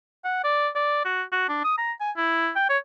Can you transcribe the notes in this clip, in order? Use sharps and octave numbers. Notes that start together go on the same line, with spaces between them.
F#5
D5
D5
F#4
F#4
D4
D#6
A#5
G#5
E4
G5
C#5